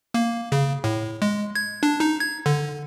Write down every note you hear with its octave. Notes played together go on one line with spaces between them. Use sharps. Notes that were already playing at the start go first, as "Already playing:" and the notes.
A#3
C#3
A2
G#3
G#6
D4
D#4
G#6
D3